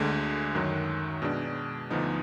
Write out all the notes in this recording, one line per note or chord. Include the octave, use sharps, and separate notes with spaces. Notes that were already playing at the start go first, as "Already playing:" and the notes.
Already playing: D2 D3 G#3
F#2 D#3 F#3
B2 G#3 D4
D2 D3 F3 B3 D#4